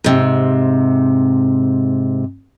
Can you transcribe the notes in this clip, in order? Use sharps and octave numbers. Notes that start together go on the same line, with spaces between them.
G#2 C3